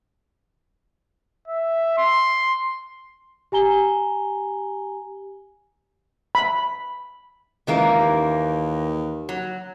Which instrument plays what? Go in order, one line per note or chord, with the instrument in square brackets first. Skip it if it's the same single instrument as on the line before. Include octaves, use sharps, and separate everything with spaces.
[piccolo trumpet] E5
C6
[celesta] G4 G#5 A#5 G7
[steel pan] B5
[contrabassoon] C#2 [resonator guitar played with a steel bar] D#3 E3 A#3
[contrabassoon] D#2
[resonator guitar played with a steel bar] F#3